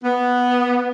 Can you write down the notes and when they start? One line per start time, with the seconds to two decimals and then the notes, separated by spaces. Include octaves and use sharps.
0.04 B3